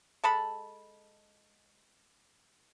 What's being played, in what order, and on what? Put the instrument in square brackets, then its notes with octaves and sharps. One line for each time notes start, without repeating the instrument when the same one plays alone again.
[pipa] G#3 A4 A5 B5